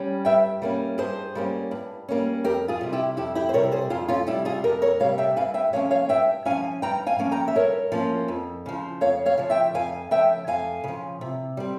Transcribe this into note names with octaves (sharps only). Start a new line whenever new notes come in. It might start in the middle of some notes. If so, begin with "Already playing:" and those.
Already playing: G3 C#4
G2 E5 G5
G3 A#3 C#4
G2 G#4 C5
G3 A#3 C#4
G2
G3 A#3 C#4
F2 G4 A#4
F4 G#4
C3 G3
E4 G4
F2 E4 G4
E4 G4
C5
C3 G3 A#4 C#5
G#4 C5
F2 F4 G#4
C#4 F4
C3 G3 E4 G4
F4 G#4
F2 G4 A#4
A#4 C#5
C3 G3 C#5 F5
E5 G5
G2 F5 G#5
E5 G5
F3 A#3 C#4 C#5 F5
C#5 F5
G2 E5 G5
F3 A#3 C#4 F5 G#5
G2 G5 A#5
F5 G#5
F3 A#3 C#4
G5 A#5
E5
G2 A#4 C#5
F3 A#3 C#4
F2
C#3 F3
F2 C#5 F5
C#5 F5
C#3 F3
E5 G5
F2 F5 G#5
C#3 F3 E5 G5
F2 F5 G#5
C#3 F3
C3
G3 C4